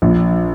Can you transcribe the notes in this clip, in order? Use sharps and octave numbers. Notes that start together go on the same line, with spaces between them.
A#1